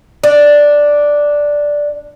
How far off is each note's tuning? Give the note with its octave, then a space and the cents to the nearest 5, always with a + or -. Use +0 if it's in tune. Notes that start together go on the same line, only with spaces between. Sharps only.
D4 +0 D5 +0